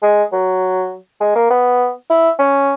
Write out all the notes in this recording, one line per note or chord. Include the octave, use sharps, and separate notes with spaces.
G#3
F#3
G#3
A#3
B3
E4
C#4